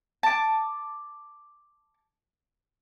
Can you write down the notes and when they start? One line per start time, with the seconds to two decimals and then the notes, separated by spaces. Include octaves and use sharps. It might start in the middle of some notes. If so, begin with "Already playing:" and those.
0.23 A5 D6